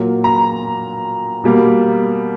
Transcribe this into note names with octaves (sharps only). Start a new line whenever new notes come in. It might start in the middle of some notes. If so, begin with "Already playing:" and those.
Already playing: A#2 F#3 A#3
A#5
B2 G3 A#3